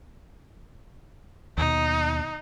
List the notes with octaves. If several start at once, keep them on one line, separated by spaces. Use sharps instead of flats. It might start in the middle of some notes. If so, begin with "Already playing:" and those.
D#2 B2 D#4